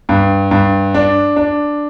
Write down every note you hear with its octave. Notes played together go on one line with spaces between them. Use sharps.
G2
G2
D4
D4